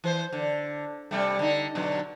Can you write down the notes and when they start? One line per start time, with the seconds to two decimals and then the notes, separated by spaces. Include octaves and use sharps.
0.04 E3 C5
0.33 D3
1.11 C3 G3 A3
1.39 D3 D#4
1.75 B2 D3 F#3